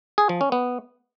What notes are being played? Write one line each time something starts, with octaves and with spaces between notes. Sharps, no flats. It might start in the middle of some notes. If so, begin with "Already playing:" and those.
G#4
F3
C#4
B3